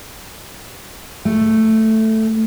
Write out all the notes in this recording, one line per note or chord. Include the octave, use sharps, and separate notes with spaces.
A3